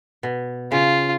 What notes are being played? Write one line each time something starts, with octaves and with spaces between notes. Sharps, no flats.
B2
C#3 F4